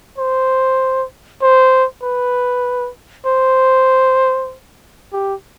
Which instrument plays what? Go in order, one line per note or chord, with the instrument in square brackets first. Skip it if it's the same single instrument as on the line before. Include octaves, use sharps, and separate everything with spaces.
[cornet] C5
C5
B4
C5
G4